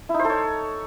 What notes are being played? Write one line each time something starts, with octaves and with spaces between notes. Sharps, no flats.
E4
D#4
C5
A4
C#5